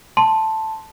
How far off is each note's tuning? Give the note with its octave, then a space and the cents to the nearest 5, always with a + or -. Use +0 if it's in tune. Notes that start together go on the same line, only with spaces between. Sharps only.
A5 +0 C6 +0